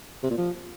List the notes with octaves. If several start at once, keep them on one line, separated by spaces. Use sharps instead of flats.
C3
A#2
F3